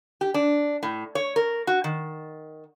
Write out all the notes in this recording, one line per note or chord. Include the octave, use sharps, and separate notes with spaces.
G4
D4
A2
C#5
A#4
F#4
D#3